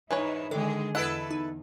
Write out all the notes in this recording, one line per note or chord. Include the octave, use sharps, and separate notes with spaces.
G#2 E3 D#4 E4 B4 C#5
D3 D#3 G#3 G#4 A4
E2 E4 A4 B4 D#5 F#5 E6
D#4